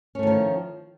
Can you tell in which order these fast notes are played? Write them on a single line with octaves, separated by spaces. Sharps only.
C#4 A3 D#3 F3